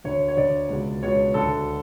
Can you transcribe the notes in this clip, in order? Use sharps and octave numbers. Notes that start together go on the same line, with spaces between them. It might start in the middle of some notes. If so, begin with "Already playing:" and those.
D2 D3 C#5
C#5
D2 D3 D5
C#2 B2
C#2 B2 C#5
D2 D3 A4